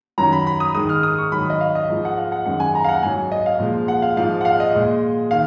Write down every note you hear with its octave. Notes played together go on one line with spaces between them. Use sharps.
F#2 D#3 F#3 A#5
B5
B5
D#6
G#2 D#3 G#3 D#6
F6
D#6
C#6
G#2 D#3 F#3 B5
D#5
F5
D#5
G#2 F3 G#3
F#5
F5
F#5
F#2 D#3 G#3 F#5
G#5
A#5
F5
F#5
G#2 F#3 G#5
D#5
F5
A#2 F3 G#3
F#5
F5
G#2 F3 G#3 F5
F#5
F5
D#5
A#2 G#3
D#3 F5